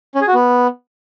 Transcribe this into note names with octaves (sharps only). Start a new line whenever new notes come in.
C#4
G#4
F#4
B3